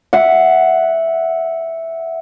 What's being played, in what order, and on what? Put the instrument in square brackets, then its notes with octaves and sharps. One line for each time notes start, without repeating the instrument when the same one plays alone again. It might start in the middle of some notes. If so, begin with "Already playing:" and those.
[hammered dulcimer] E5 F#5